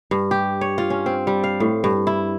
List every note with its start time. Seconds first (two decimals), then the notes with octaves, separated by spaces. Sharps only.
0.11 G2
0.31 G4
0.61 C#5
0.78 F4
0.90 C#4
1.06 C4
1.27 G3
1.44 F5
1.60 A2
1.84 G2
2.07 E4